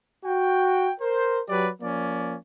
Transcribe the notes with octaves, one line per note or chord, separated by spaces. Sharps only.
F#4 G5
A#4 C5
F#3 G4 B4 D5
F3 A#3 C#4 D5